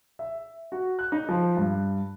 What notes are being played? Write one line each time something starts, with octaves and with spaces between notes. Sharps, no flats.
E5
F#4
F#6
D#4
F3
G2